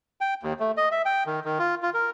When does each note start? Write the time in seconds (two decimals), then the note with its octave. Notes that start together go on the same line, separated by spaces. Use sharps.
0.21 G5
0.43 D#2
0.60 A3
0.77 D#5
0.91 E5
1.05 G5
1.26 D#3
1.45 D#3
1.59 F4
1.83 F4
1.94 A#4